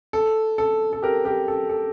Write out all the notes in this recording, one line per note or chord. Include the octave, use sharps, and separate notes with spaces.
A4
A4
A4
G4 A#4
G4 A#4
A4
A4